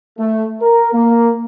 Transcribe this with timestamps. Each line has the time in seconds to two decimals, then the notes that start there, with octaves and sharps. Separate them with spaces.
0.19 A3
0.61 A#4
0.93 A#3